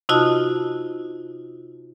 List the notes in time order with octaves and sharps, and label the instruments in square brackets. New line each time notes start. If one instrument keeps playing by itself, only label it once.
[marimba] C3 D#4 F4 F#4 D#5 A5